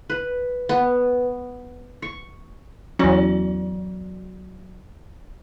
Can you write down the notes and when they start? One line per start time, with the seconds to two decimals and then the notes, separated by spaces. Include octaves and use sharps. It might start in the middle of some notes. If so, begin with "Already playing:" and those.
0.10 B4
0.69 B3
2.02 C#6
2.99 E2 F#3 C#4 F#4 D5